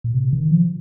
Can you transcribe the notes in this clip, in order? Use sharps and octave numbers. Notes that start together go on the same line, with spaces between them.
A#2
C3
D#3
F3